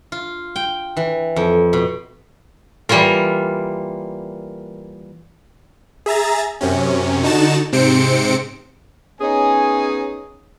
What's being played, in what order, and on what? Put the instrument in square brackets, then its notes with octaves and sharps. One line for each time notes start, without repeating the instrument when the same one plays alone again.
[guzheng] F4
G5
E3
F2
B2
[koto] E3 G3 A#3 F4 A#4
[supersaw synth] G#4 E5 A#5 A6
F#2 C3 C#4
D3 D#4 F#4 A5 E7
G#2 C3 C4 C5 C#7 D7
[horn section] B3 C#4 D#4 G#4 C#5 G#5